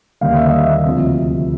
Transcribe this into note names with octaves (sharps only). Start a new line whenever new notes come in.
D#2 D3 G3 A#3 C#4 F5
E5
D#5
E5
D2 C3 F3